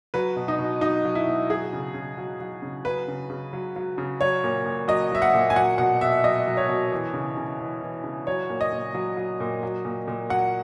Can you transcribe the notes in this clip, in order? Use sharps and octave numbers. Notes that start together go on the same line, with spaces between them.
F#3 B4
B2
D#4
B2
F#3 D#4
F#3
E4
B2
F#3 G#4
C#3
C#3
F#3
F#3
C#3
F#3 B4
C#3
C#3
F#3
F#3
C#3
F#3 C#5
A#2
A#2
F#3 D#5
F#3 E5
F#5
A#2
G#5
F#3 F#5
B2 F#5
B2 E5
F#3 D#5
F#3
C#5
B2
E3
C#3
C#3
E3
E3
C#3
F#3 C#5
A#2
D#5
A#2
F#3
F#3
A#2
F#3
A#2
A#2
F#3 F#5